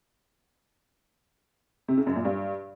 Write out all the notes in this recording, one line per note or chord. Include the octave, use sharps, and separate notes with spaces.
C3
C#3
F#2
A#2
G2